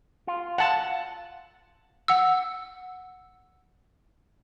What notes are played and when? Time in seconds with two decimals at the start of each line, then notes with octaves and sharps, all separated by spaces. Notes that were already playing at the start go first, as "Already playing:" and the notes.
0.27 F4
0.58 F#5 A5
2.08 F#5 E6